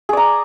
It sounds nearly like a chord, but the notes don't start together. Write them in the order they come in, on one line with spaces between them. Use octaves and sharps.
G#4 D5 A#5